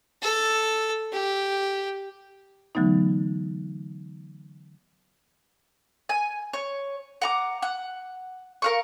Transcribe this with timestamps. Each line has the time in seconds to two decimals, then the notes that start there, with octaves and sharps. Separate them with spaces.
0.23 A4
1.13 G4
2.75 D3 E3 F#3 A3 B3 D#4
6.09 G#5
6.53 C#5
7.22 F#5 A#5 D6
7.62 F#5
8.62 A#4 F5 C#6